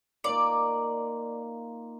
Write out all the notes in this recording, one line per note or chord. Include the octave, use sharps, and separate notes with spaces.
A#3 D#4 F4 D5